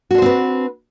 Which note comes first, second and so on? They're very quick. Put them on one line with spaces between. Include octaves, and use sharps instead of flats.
F#4 D4 C5 C4 B4